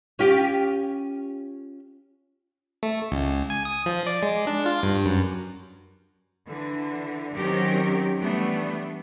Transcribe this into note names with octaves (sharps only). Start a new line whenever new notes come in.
C#4 F4 G4
A3
C#2
G#5
D#6
F3
D5
G#3
D4
F4
G2
F#2
D3 E3
D#3 F#3 C4 C#4 G4 A#4
E3 G3 A3 B3 D4